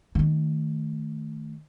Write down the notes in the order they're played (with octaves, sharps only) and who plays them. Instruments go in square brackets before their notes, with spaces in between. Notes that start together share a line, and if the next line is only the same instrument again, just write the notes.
[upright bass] D#3 A3